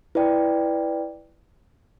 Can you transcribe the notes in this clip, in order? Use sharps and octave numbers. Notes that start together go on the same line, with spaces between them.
E4 B4 D5 G5